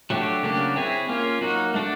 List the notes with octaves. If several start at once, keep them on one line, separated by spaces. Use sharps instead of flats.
F#3 A3 D4 G4
C#3 F#3 A#3 D4 G4
C4 E4 G#4 C#5
A#3 C#4 F4
F#3 A#3 D#4 F#4
A3 D4 F#4